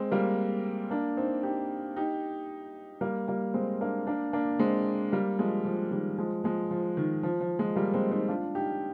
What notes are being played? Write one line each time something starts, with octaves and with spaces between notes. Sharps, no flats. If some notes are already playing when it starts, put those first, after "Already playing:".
Already playing: G#3 C4
G3 A#3
A#3 D4
C4 D#4
D#4 G4
D#4 G4
G3 A#3
G3 A#3
G#3 C4
A#3 D4
A#3 D4
A#3 D4
G#3 C4
G3 A#3
F3 G#3
F3
D#3 G3
F3 G#3
F3 G#3
F3
D#3
F3
F3
F3 G#3
G3 A#3
G#3 C4
C4 D#4
D4 F4
D#4 G4